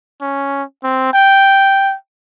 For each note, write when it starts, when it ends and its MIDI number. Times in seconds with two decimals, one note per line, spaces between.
0.21 0.63 61
0.84 1.12 60
1.14 1.95 79